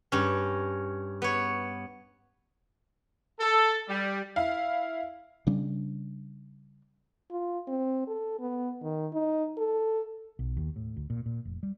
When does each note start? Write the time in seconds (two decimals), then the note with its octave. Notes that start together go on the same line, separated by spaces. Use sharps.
0.12 G2 C#4
1.22 B3 C#5
3.40 A4
3.89 G3
4.36 E4 F5
5.47 C#3 G3 C#4 D4
7.31 F4
7.68 C4
8.07 A4
8.40 B3
8.82 D#3
9.13 D#4
9.57 A4
10.39 B1
10.57 D#2
10.76 A2
10.96 D2
11.10 A#2
11.26 A#2
11.45 F1
11.63 G3